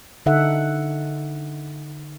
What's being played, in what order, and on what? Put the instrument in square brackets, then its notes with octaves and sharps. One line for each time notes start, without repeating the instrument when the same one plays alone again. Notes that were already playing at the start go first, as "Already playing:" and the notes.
[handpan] D3 D#4 A4 E5 F#5